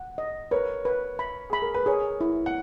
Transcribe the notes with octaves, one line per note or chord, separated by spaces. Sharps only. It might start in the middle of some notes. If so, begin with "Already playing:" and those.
Already playing: F#5
D#5
A#4 B4 C#5
B4
B5
G#4 B5
A#4
B4
G#4 A#4 C#5
E4
F#5